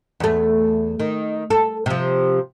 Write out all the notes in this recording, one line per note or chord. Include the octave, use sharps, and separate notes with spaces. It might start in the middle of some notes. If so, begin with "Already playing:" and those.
E2 A3
D#3
A4
C3 F3